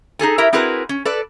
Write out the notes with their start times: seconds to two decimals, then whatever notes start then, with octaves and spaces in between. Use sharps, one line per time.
0.19 D#4 G#4 A4 G#5
0.38 E4 G4 A#4 E5
0.53 C4 E4 F#4 G#4 A#4 B4
0.89 C#4
1.05 A4 B4 D5